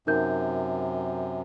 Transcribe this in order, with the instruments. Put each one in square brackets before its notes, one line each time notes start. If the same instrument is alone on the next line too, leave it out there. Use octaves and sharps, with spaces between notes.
[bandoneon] F#2 C3 [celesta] D#4 A#4 G6